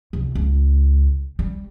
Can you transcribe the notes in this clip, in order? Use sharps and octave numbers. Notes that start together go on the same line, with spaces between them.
C2 F2
C#2
G3